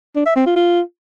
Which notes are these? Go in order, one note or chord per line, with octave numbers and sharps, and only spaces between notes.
D4
E5
C4
F4
F4